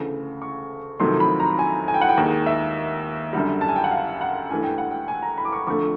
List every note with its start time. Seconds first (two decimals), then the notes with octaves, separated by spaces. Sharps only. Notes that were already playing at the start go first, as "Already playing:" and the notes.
Already playing: D2 C#3 E3 A3
0.42 C#6
1.00 F2 C3 D#3 F#3 A3 C6
1.20 B5
1.40 A#5
1.59 G#5
1.88 G#5
1.94 G5
2.01 F#5
2.09 G5
2.17 D#2 D#3 G#3
2.46 E5
3.33 F#2 D3 G3
3.61 A5
3.68 G#5
3.76 G5
3.84 F#5
3.91 F5
4.21 F#5
4.50 G2 E3 A3 G#5
4.63 G5
4.78 F#5
4.91 G5
5.08 G#5
5.22 A#5
5.38 B5
5.45 D6
5.53 C#6
5.67 F2 D3 F3 A3 C#6